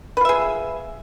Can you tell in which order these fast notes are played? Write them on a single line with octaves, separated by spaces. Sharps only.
B4 F4 E5 G#4